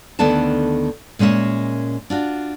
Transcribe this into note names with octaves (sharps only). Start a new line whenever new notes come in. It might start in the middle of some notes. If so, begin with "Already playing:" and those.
D2 D#3 B3 D4 A4 A5
A#2 G#3 C#4 A#4 E5
D4 F4 F#4